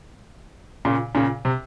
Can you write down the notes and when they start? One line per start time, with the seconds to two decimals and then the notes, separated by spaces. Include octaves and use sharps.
0.85 A#2 C#3
1.15 A#2 C#3
1.45 C3